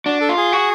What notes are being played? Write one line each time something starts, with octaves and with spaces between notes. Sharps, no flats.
D4 F#4
A4
F4
G#4
F#4